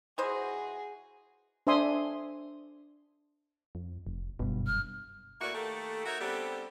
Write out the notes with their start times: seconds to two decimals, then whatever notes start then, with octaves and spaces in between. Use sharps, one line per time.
0.18 E3 F#4 G#4 C5 D#5
1.67 D4 C5 E5 G#5 C6 D#6
3.75 F2
4.07 F1
4.39 F#1 G2 B2
4.67 F6
5.40 A3 A#3 E4 F#4 A#4 D5
5.54 D#3 A3 A#3 G4 A4
6.06 D#4 F#4 A#4 C#5 E5
6.20 G3 B3 C4 D4 G4 A4